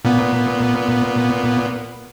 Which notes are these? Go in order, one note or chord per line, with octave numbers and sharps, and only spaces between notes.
A#2 B3